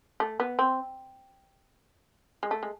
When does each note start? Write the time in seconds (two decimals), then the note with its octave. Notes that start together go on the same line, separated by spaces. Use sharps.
0.20 A3
0.40 B3
0.59 C4
2.43 G#3
2.51 A3
2.63 G#3